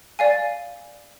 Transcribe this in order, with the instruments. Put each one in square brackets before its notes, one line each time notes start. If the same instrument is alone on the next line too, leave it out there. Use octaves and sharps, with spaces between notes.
[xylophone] D5 F5 G#5